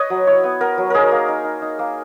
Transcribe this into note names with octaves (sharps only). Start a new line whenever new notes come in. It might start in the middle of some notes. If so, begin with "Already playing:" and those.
Already playing: B4 C#5 D#5
F#3
E4 C#5
B3
B3 A#4
F#3
D#4 G#4 A#4
A#3
D#4
D#4
D#4
A#3